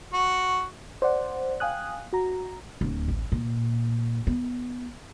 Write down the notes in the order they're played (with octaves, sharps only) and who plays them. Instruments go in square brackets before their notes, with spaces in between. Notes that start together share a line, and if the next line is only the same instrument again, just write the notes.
[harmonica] F#4
[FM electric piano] C5 D5 F#5
F5 G5 G#5 D#6 F#6
F#4 A#5
[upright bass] D1
A1
A#2
B3